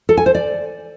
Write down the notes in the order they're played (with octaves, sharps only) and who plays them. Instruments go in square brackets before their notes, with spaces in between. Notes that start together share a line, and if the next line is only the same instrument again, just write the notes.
[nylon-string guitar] A4
G#5
C5
D5